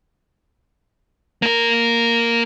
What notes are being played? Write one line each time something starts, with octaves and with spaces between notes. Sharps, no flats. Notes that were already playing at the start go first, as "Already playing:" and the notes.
A#3 A#4